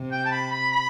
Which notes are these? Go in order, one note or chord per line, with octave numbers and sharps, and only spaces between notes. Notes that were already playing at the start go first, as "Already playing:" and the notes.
Already playing: C3
G5
A5
B5
B5
B5